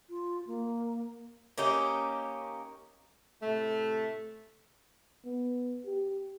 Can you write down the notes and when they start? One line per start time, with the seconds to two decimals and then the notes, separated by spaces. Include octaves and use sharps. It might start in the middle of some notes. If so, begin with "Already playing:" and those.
0.10 F4
0.47 A#3
1.58 A#3 C#4 D#4 G4
3.42 A2 C3 A3
5.26 B3
5.86 G4